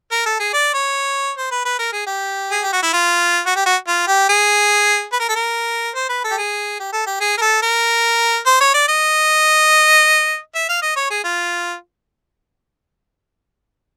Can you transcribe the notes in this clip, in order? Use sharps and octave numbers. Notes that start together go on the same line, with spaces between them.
A#4
A4
G#4
D5
C#5
C5
B4
B4
A#4
G#4
G4
G#4
G4
F#4
E4
F4
F#4
G4
F#4
F4
G4
G#4
B4
A#4
A4
A#4
C5
B4
A4
G4
G#4
G4
A4
G4
G#4
A#4
A4
A#4
C5
C#5
D5
D#5
E5
F5
D#5
C#5
G#4
F4